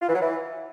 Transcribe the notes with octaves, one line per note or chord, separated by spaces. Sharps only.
F4
E3
F#3
E3